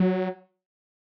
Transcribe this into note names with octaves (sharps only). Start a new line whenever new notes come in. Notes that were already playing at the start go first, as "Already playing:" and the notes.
Already playing: F#3